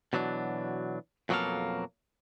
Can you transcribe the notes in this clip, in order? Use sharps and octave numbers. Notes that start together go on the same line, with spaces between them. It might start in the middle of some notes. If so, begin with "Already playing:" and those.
B2 E3 F#3 D4
F2 B2 F#3 A#3 A4 F5